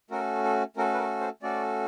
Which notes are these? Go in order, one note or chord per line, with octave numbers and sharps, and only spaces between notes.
A3 C#4 F#4 A4 A#4
A4
A3 C#4 F#4 A4 A#4
B4
A#4
C5
A3 C#4 F#4 A4 D5